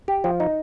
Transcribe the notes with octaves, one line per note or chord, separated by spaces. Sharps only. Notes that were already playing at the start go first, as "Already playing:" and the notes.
G4
F3
D#4